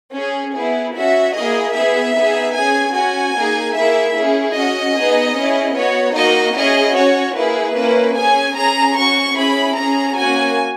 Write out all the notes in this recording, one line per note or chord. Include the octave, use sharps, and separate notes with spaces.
C#4 G#4
B3 E4 G#4
C#4 F#4 E5
A#3 E4 G#4 D#5
B3 E4 G#4 E5
B3 D#4 G#4
C#4 G#4 G#5
C#4 F#4 G#5
A#3 D#4 G#4
A#3 E4 G#4 E5
C#4 E4 G#4
C#4 F#4 D#5
B3 D#4 G#4
C#4 E4 G#4
B3 F#4 C#5
A#3 D#4 F#4 D#5
C#4 E4 G#4 D#5
C#4 F#4 C#5
A#3 E4 G#4 B4
A#3 C#4 E4 B4
C#4 G#4 G#5
C#4 G#4 A#5
C#4 F#4 C#6
C#4 E4 G#4 B5
C#4 G#4 A#5
A#3 C#4 F#4 G#5